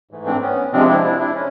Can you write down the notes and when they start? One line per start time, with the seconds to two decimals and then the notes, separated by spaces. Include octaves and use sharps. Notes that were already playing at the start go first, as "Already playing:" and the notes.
0.11 G#2 E3 A3
0.26 C4 D4
0.42 B3 C#4
0.73 C3 F3 G#3 C4 D4
0.89 D4 E4
1.04 D4 E4
1.20 D4 E4
1.35 C#4